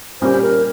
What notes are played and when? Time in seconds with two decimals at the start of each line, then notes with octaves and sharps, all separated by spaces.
0.21 A#2 G3 A#3 C#4 G4 C5
0.41 A#4